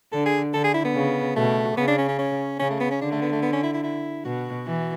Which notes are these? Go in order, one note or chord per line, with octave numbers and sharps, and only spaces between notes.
D3 A4
G#4
D3 A4
G#4
E4
B3
C#3
B2 A3
C#3 B3
D4
C#4
C#4
C#4
C#3 C#4
A3
B3
C#4
D3 D4
A3
B3
A3
B3
C#4
E4
E4
E4
B2 F#4
E3